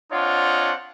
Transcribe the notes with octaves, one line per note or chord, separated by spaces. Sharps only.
C4 D4 F4 C#5 D#5 F#5